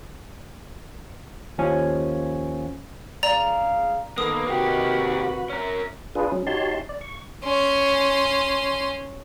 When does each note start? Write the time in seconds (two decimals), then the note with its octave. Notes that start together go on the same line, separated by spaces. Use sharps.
1.58 D#2 F3 C#4 G#5
3.23 C#2 G#4 D5 F5 A#5 F7
4.18 D#3 A#3 B3 A4 D#6
4.48 C3 D#3 A#3 F#4 G4 B4
5.50 C#4 A#4
6.15 D4 F4 G#4 B4
6.32 F#3 C#4
6.47 D#4 F#4 G4 C#5 A5 C6
6.89 D5
7.01 C#6
7.44 C#4 C6